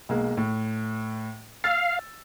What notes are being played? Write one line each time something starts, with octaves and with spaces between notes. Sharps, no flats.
B1 G#3 A#3
A2
F5 E6 A6